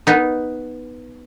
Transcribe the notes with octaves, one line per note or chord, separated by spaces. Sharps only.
B3 D#4